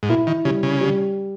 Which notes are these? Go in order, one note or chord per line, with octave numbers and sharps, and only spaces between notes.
G#2
A#2 E4
D#3
C#3 G3
C#3
G3